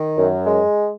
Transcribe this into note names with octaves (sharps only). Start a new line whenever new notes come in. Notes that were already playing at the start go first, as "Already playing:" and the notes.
Already playing: D#3
F#2
G#3